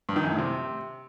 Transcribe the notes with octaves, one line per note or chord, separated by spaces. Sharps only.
G2
D#3
F#2
A2
C3